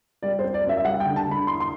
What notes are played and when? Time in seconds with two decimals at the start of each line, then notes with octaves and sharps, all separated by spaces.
0.23 G3 D5
0.39 C5
0.44 C4
0.54 D5
0.64 F#2 E5
0.77 E5
0.85 G3 F#5
1.00 G5
1.06 D3
1.16 A5
1.27 D3 B5
1.47 E4 C6
1.60 C6